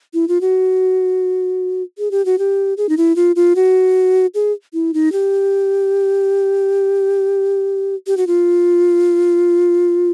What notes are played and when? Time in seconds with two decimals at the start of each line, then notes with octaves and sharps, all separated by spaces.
0.14 E4
0.28 F4
0.41 F#4
1.98 G#4
2.11 G4
2.26 F#4
2.39 G4
2.77 G#4
2.89 D#4
2.97 E4
3.16 F4
3.36 F4
3.56 F#4
4.34 G#4
4.73 E4
4.94 D#4
5.12 G4
8.07 G4
8.17 F#4
8.27 F4